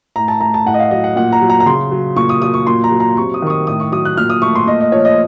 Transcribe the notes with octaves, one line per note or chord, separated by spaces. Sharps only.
A2 A#5
A5
A3 A#5
A5
A2 F#5
D#5
F5
F#3 D#5
F#5
A#2 F#5
A#5
F#3
A#5
A#5
C#3 C6
F#3
A#2 C#6
D#6
F#3 D#6
C#6
A#2 C6
A#5
F#3
A#5
C3 C#6
D#6
D#3 C#6
D#6
A2 D#6
C#6
F#3 D#6
F#6
A#2 F6
D#6
A3 C#6
C6
A#2 D#5
D#5
F3 C#5
D#5